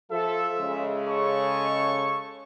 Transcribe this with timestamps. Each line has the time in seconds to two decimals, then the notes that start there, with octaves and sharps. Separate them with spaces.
0.10 F3 F4 A4 E5
0.59 C#3 G#3
1.07 A4 C#5 C#6